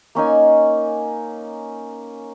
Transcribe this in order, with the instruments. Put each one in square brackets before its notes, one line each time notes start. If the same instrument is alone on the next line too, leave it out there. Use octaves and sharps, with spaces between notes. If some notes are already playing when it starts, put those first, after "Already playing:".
[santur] A#3 C#4 D#4 G#5